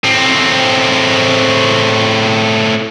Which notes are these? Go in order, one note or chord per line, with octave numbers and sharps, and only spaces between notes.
A2 C4